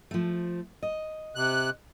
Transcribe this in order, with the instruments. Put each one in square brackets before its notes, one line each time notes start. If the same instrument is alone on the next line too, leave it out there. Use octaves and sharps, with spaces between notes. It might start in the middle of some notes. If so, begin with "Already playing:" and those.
[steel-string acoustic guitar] F3 A3
D#5
[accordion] C3 F#6